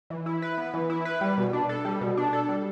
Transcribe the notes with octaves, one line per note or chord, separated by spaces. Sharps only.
E3
E4
B4
B3
E3
E4
B4
G3
B2
D4
A4
G3
B2
D4
A4
G3